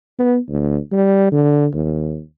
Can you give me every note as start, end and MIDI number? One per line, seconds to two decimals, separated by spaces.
0.19 0.38 59
0.49 0.78 38
0.92 1.31 55
1.32 1.67 50
1.74 2.20 39